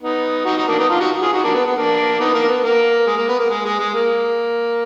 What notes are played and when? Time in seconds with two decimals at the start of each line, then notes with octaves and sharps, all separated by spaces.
0.02 B3 D#4
0.45 D#4 F#4
0.57 D#4 F#4
0.68 A#3 D4
0.79 B3 D#4
0.89 D4 F4
1.00 D#4 F#4
1.22 F4 G#4
1.32 D#4 F#4
1.44 A#3 D4
1.54 B3
1.66 B3
1.76 A#3 D4
2.20 B3 D#4
2.34 A#3 D4
2.48 B3
2.63 A#3
3.07 G#3
3.18 A#3
3.28 B3
3.39 A#3
3.50 G#3
3.65 G#3
3.80 G#3
3.94 A#3